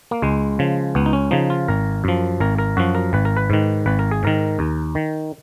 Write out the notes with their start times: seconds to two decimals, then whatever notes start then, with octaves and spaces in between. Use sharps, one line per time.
0.11 A#3
0.22 C#2 G#3
0.59 C#3 F3
0.95 C#2 B3
1.06 D#4
1.13 C#4
1.31 C#3 F3 D#4
1.50 F4
1.68 G#1 A#4
2.04 F#2 F3
2.40 G#1 A#4
2.58 A#4
2.77 F#2 F3 F#4
2.95 A#4
3.13 G#1 B4
3.25 A#4
3.37 B4
3.50 G#2 D#3
3.86 G#1 B4
3.99 A#4
4.11 G#4
4.23 G#2 D#3 A#4
4.59 D#2
4.95 D#3